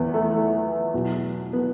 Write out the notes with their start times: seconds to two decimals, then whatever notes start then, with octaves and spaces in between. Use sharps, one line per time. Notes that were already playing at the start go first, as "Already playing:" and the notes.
Already playing: E2 E3 B3
0.14 A3
0.34 A3
0.94 E2 B2 F#3
1.53 B3